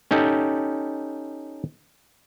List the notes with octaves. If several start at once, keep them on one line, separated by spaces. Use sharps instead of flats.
C#4 D#4 G4 A4